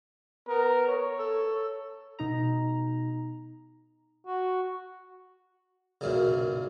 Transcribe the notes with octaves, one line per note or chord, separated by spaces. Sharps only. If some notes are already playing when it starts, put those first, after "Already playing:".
B3 A#4
C#5
A4
B2 D#4 A#5
F#4
B1 F#2 A#2 C#3